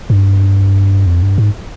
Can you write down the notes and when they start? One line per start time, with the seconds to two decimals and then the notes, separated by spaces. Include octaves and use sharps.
0.10 G2
1.06 F2
1.22 G2
1.38 G#2